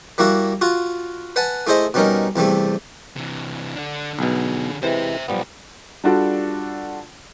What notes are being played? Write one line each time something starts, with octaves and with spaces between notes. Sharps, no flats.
G3 A#3 E4 F#4
F4 F#4
B4 F#5 G#5 A5
A3 E4 G#4 C5 D#5
B2 G3 C#4 D#4 A#4
E2 C3 G3 A3
C3 E3
D3 D4
B1 B2 D3 G#4
C3 E3 G#3 C5 E5
B1 G2 F3 G3 B3
G3 D4 F4 F#4 A4 D5